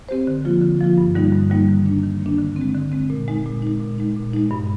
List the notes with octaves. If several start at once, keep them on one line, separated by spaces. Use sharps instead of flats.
C4 G4 C5
D3
F3 A#3 F4
D3
F3 A#3 F4
G2
D3 G3 A#3 D#4
G2
D3 G3 A#3 D#4
D#3
A#3 D4
D#3
A#3 D4
D3
C4
G#3
D3
G#3 C4
A#2
G#3 D#4
A#2
G#3 D#4
A#2
G#3 D#4
A#2
G#3 D#4
G2